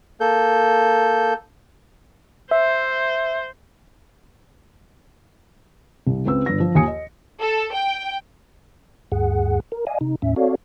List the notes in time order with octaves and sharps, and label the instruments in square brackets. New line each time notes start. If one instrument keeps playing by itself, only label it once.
[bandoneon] A#3 A4 G6
[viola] C5 [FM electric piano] E5
[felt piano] C2
C#2 C4 B4 E6
G1 D4 B4 A#6
F3
D#2 D#3 F4 G#5 D#6 C#7
D#5
[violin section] A4
G5
[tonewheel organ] D2 G2 G#4 F#5
A#4
D5 D#5 F5 G#5
C3 D#4
D#2 A2 C#4 E5
C4 F#4 A4 C#5 D5 F5